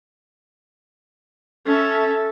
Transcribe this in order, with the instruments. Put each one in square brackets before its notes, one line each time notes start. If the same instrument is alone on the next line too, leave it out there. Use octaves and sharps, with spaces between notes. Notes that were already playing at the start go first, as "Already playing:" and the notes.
[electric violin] C#4 E5 [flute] A4